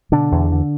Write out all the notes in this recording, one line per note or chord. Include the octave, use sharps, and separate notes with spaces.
B2 D3 D4
E2
D3